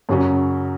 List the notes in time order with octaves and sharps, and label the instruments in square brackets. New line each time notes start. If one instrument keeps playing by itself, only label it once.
[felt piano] F#2 C#3 F#3 C#4